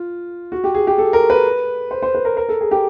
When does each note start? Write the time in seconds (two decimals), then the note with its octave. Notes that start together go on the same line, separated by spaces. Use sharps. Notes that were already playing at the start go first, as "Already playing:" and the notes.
Already playing: F4
0.52 F#4
0.64 G4
0.75 G#4
0.87 G4
0.98 A4
1.13 A#4
1.30 B4
1.91 C5
2.02 C5
2.15 B4
2.25 A#4
2.37 A#4
2.49 A4
2.61 G#4
2.71 G4